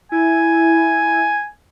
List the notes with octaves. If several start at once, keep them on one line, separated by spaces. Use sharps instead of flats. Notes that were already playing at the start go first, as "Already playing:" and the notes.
E4 G#5